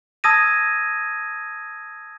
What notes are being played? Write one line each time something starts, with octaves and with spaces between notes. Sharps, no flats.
A5 D#6 E6 G#6 A#6 D#7